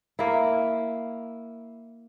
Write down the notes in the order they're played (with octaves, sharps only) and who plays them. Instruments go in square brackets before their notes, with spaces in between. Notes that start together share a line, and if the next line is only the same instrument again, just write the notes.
[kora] A#3 E4